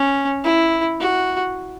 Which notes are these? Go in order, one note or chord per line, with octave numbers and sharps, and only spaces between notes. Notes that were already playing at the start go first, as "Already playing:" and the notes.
Already playing: C#4
E4
F#4